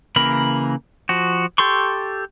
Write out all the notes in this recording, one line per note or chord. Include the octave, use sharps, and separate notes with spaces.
C#3 E3 A#3 A#4 B5
F3 F#4
G4 A4 C6 C#6